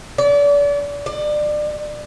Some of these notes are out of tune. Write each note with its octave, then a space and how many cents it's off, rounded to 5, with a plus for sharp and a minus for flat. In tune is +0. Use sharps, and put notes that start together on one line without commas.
D5 -35
D5 +30